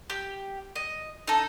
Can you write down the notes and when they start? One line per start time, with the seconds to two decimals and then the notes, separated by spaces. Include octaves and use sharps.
0.10 G4
0.76 D#5
1.28 D#4 A4